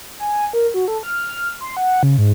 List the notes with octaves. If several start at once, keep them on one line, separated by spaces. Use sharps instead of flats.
G#5
A#4
F#4
A4
F6
C6
F#5
C#3
G#2